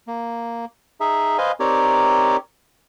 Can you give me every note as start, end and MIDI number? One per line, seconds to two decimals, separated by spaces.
0.07 0.65 58
1.00 1.37 63
1.00 1.37 68
1.00 1.37 76
1.38 1.52 71
1.38 1.52 72
1.38 1.52 75
1.38 1.52 77
1.38 1.52 80
1.60 2.37 60
1.60 2.37 63
1.60 2.37 67
1.60 2.37 70
1.60 2.37 73
1.60 2.37 74